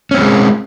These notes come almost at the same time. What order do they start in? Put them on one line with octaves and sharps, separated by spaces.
C#4 C4 G3 G#3